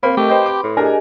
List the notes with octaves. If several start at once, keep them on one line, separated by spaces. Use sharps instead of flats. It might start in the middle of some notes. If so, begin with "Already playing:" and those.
A#3 C4 B5
A3 G4 A#4 D#5
B4 C5 D#5 G5 B5 C6
D6
A2
D4 G4 G#4 A#4 D#5 G#5